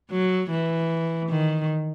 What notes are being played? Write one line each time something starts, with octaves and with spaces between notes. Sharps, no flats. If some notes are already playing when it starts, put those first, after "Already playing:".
F#3
E3
D#3